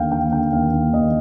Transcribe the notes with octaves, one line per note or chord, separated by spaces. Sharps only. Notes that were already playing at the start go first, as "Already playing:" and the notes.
Already playing: D#2 D3 F5 G5
D#2 G5
D3 G5
D#2 F5
D#2
D#2 D#5